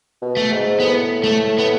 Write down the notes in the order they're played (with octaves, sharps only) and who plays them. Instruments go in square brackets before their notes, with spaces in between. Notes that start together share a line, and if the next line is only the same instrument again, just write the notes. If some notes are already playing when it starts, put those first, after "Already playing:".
[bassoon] B2
[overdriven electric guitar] A3
[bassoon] G#2
[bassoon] A2 [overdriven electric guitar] B3
[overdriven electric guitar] A3
B3